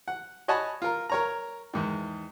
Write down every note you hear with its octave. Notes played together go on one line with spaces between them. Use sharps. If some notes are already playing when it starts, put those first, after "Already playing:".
F#5
C#5 D#5 F#5 G#5 A5 B5
F4 A#4
A#4 C#5 A#5
E2 G#2 D#3